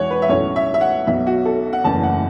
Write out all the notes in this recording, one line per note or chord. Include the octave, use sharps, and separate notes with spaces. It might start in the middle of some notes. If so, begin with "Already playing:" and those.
Already playing: E1 E2 E3 C#5 F#5
B4
E5
B1 A2 A3 C#4 C#5
E5
E5
F#5
B1 B2 B3 E5
F#4
A4
F#5
F#1 E2 E3 A3 C#4 A5
F#5